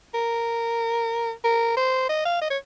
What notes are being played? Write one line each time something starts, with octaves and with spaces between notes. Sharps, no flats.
A#4
A#4
C5
D#5
F5
D#5
C#5